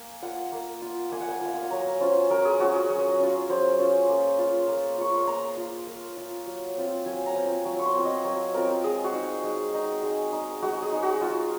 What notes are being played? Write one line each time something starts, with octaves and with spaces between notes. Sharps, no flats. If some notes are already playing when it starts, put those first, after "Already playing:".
Already playing: A#3 G#5
F4 F#5
A#3
F4
A#3 G#5
F#5
G#5
F4 F5
F#5
G#5
F#3 A#5
C#4 F4 C5
F#3 A#4
G#4
C#4 F4 F#4
G#4
F#3
C#4 F4
F#3 C5
C#4 F4
A#3
F4
A#3
F4 C#6
C6
A#3 A#5
F4
A#3
F4
F#3
C4 F4
F#3 G#5
A#5
C4 F4
G#5
F#3
C#6
C6
C4 F4
D#5
F#3 C#5
C4 F4 A#4
G#3 G#4
F#4
D#4
G#3
D#4
G#3
D#4
G#3 F#4
G#4
D#4
F#4
G#3 F4